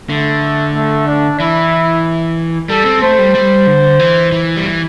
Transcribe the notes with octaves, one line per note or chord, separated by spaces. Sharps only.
D3 A3
A3
D4
E3 E4
G3 A4
C4
A3 C5
G3
G3
D3
E3
E3
G3
E3